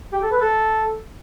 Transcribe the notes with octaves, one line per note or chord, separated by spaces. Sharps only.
G4
A4
B4
A4